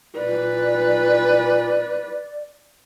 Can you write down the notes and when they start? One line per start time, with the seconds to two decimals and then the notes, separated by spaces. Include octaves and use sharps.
0.17 A#2 B4 D5